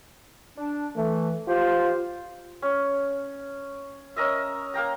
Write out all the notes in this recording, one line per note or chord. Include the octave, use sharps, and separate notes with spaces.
D4
E3 A3
F4 G4 C5
C#4
C#4 A#4 D#5 E5
A#3 F5 G5 A#5